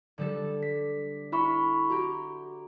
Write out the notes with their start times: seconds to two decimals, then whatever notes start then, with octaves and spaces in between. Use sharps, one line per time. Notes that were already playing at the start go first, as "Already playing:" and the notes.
0.18 D3 G3 A4
0.63 B6
1.32 E4 E5 B5 C#6
1.90 F#4 G4 A#5